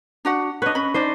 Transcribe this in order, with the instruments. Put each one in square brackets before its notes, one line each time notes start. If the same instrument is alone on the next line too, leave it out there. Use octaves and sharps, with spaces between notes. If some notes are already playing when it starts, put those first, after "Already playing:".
[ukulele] D4 F#4 F#5
[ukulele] D4 B4 [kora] C#5 D#5
[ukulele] C#4 B5
[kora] D4 D#4 C5